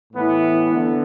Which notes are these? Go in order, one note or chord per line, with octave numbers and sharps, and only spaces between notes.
A2 E3 B3 E4
D3 B3